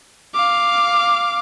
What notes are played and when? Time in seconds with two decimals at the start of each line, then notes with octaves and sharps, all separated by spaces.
0.34 F5 D6